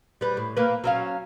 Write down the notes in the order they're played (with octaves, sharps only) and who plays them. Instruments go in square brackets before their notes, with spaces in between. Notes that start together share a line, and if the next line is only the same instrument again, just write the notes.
[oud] G3 B4
A2
A#3 B4
F#3 C#4 F5